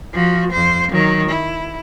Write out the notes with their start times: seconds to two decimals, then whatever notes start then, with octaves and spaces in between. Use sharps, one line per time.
0.13 F3 F#4
0.52 F2 C5
0.92 D#3 F#3
1.29 E4